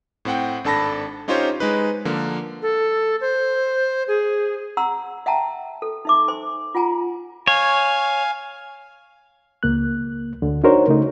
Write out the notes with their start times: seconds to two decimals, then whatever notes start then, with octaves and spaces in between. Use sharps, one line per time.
0.25 A2 C4 F#5 G5
0.64 G#1 D4 A4 A5 B5 A#6
1.28 C#4 D#4 F4 G4 C5 C#5
1.60 G#3 D#4 B4
2.05 D3 F3 A#3
2.62 A4
3.21 C5
4.08 G#4
4.77 F#5 A#5 C6 E6
5.26 E5 F#5 G5 A5 A#5
5.82 A4
6.05 D#4 E5 D6
6.28 C5 G#5 C6
6.75 F4 F#5 G#5 A#5
7.47 C#5 F5 G#5
9.63 C#2 A#3 F#6
10.42 D2 D3
10.64 D4 D#4 F#4 A#4 C5 C#5
10.88 C#3 A3 D#4